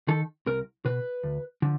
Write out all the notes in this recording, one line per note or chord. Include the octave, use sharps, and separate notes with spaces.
D#3 A4
C2 A#4
B2 B4
D2
D3 F3